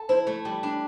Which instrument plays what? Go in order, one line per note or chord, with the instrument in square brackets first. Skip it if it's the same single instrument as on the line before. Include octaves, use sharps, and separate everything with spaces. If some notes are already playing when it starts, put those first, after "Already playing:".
Already playing: [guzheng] A4
[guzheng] E4 [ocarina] C5
[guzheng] A3
G3
D4